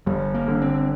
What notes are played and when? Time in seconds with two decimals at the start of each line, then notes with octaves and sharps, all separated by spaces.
0.06 G1 G3
0.34 A#3
0.48 D3
0.62 C4